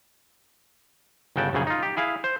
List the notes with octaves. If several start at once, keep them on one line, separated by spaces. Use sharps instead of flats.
G1 C#3 F#4 G5 A5
A#1 F#2 C#3 G#4
D#4 F4
G4
E4 G#4 F5
C5